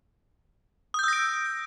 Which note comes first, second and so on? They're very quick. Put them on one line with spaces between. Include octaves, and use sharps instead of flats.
D#6 G6 E6 A#6 D7